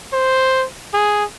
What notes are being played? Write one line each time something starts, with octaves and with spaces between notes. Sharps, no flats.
C5
G#4